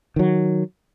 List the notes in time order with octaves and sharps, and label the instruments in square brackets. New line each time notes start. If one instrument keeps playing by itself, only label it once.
[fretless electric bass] D#3 F#3